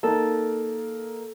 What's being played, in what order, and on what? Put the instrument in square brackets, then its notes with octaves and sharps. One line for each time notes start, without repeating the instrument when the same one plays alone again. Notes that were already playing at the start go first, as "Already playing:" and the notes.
[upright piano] A#3 D#4 [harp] A4